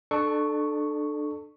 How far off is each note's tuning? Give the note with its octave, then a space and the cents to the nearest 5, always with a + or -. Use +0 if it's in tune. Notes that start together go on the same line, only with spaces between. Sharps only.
D4 +30 A4 -10 C#6 +0